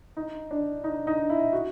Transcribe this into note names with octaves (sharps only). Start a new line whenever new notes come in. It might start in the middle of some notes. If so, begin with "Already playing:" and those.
D#4
D4
D#4
D#4
E4
F#4